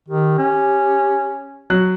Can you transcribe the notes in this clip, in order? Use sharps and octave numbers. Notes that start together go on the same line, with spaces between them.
D#3 G4
C#4
F#3 F#6